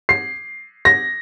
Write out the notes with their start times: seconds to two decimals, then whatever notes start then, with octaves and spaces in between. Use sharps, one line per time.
0.09 C7
0.85 A#6